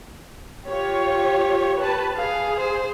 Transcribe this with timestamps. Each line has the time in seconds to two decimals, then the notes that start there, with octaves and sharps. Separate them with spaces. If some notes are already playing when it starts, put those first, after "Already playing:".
0.68 F4 G4 C#5
1.79 B4 A5
2.17 G#4 F5
2.59 C5